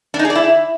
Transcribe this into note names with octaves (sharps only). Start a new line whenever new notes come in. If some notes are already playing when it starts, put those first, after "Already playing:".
D4
D#4
G#4
D5
E4